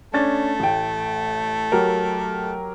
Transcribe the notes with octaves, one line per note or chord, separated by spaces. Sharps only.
A3 C#4 D4 A6
A1 G5
F#3 G4 A#4